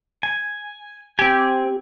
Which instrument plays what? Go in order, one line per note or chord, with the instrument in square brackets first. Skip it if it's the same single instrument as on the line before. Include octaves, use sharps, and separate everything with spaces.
[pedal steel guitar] G#5
[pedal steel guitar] C4 G#5 [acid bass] G4